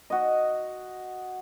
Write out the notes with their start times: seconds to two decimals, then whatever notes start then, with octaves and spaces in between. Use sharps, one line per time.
0.10 F#4 D#5